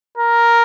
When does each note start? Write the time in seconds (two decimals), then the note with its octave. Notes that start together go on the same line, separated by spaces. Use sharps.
0.18 A#4